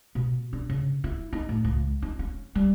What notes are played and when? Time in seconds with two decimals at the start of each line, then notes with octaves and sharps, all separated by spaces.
0.15 B2
0.53 D4
0.70 C#3
1.04 E4
1.33 D#4
1.49 A2
1.64 C#2
2.02 D#4
2.19 C#4
2.55 G3